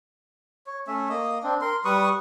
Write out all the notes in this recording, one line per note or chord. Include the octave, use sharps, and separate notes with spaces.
C#5
A3 C#4 E5
A#3 D#5
C4 D4
A#4 C6
G3 B4 C#6 D#6